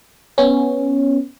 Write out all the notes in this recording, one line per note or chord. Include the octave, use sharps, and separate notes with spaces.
B3 C#4